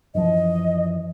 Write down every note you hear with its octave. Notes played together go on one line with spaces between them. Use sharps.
F#2 E3 F3 D#5